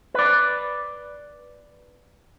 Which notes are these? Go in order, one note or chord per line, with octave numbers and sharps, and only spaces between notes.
B4 D5